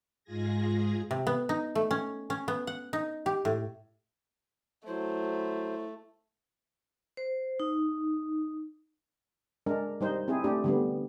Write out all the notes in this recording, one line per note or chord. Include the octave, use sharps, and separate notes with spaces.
G#2 G#3 F4 G#4 G#6 A#6
C3
B3
D#4
A3
C#4
C#4
B3
F#5
D#4
G4
A2
F#3 A3 E4 C5
C5
D#4
G#3 D4 A#4
G3 D#4 C5
C4 E4 G#4
A3 D4 G4
D3 G3 B3